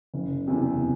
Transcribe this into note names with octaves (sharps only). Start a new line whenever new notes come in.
F#1
E2 C3